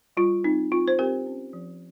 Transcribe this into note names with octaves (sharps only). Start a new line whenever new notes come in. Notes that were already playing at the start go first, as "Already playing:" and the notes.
G3 F4
C4 D#4
C4 F4
C5
C4 G4 A#4
C#4
F3